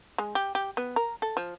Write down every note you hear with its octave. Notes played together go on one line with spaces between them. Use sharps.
G#3
G4
G4
B3
A#4
A4
F3